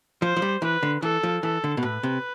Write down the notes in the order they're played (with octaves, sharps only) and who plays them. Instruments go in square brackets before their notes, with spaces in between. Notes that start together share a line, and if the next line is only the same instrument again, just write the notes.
[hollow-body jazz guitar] F3 [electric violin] C5
[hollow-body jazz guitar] F3
G3
[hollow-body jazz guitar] E3 [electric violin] B4
[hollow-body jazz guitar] D3
[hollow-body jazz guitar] E3 [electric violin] A4
[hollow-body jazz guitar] F3
[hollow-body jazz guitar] E3 [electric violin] A4
[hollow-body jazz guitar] D3
B2
[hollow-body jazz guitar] A2 [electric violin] B4
[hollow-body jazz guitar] C3